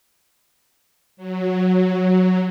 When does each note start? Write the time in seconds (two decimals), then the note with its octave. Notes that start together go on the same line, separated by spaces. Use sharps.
1.17 F#3